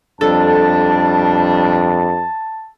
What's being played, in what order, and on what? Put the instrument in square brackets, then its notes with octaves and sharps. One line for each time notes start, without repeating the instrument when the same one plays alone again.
[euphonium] F2 [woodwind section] G3 D4 [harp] A4 [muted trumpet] A5